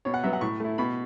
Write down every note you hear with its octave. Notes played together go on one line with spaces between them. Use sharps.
B2 C#5
F#5
F#3 B3 E5
F#5
A2 C#6
A3 E4
B2 B5